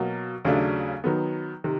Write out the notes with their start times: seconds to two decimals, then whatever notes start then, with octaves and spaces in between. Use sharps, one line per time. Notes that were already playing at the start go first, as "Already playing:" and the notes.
Already playing: B2 F#3 A#3
0.45 D#2 C#3 F#3 A3 D4
1.04 D#3 F#3 B3
1.64 C3 D#3